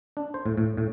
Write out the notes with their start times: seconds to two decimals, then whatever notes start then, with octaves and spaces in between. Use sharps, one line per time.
0.17 D4
0.34 C5
0.46 A2
0.58 A2
0.77 A2